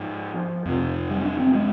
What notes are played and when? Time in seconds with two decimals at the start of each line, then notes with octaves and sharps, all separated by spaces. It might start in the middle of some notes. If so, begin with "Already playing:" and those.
Already playing: G#2 F3
0.65 F2 C3
1.10 G3
1.25 D4
1.40 C4
1.55 G#3